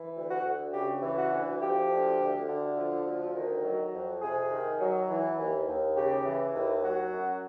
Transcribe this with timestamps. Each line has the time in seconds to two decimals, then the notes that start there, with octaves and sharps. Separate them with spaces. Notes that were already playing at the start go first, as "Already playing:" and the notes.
Already playing: E3
0.16 D2
0.30 F#4
0.44 D2
0.73 C#3 G4
1.03 E3
1.17 F#4
1.31 D2
1.60 F3 G4
1.90 D2
2.19 D2
2.48 D3
2.77 F3
3.05 D2
3.35 D#3
3.64 F#3
3.93 F2
4.22 C3 G#4
4.51 D#3
4.79 F#3
5.10 E3
5.38 D#2
5.67 D#2
5.96 C#3 G4
6.25 E3
6.54 D#2
6.83 F#3 F#4
7.12 F#2